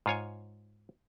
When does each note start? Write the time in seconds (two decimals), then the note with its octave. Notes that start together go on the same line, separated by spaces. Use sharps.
0.06 G#2 F4 C#5 G#5